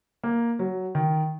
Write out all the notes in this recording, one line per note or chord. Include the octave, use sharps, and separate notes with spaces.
A#3
F#3
D#3